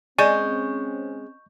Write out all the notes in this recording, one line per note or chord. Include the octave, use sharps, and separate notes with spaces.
G#3 C4 C#4 D5 G#5 C#6 G6